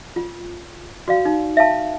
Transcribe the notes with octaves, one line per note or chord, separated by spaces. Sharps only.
F4
F#4 D5 F5
D#4
E5 F5 A5